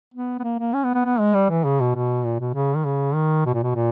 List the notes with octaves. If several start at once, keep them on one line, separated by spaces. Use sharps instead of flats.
B3
B3
A#3
A#3
C#4
B3
B3
B3
G#3
G3
E3
C#3
B2
B2
A#2
B2
C#3
D#3
C#3
D#3
B2
A#2
B2
A#2